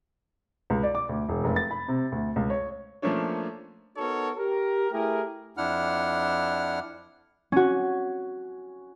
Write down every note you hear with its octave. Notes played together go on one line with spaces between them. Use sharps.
C#2
D5
D6
D2
E1
F1
A6
B5
C3
D2
C#2
C#5
F3 A3 A#3 C#4 D4 C#5
B3 D#4 F#4 A4 A#4 C#5
G4 A#4
A3 E4 G4 G#4 A#4
F2 D4 E4 F#5 F6
C#4 F#4